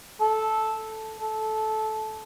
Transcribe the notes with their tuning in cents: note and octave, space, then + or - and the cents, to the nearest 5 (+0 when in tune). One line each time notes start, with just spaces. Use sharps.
A4 -10
A4 -15